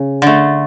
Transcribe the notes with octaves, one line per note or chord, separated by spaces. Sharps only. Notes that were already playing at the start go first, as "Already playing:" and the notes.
Already playing: C#3
D3 A3